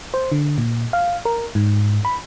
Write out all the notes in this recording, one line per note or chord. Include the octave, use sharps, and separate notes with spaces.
C5
D3
A#2
F5
A#4
G#2
B5